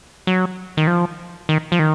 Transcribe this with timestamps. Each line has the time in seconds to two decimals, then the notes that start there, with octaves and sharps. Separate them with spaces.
0.27 F#3
0.77 D#3
0.87 F3
1.49 D#3
1.72 F3
1.79 D#3